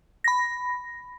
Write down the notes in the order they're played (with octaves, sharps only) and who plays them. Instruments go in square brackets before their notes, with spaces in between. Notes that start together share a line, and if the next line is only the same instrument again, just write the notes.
[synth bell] B5 A#6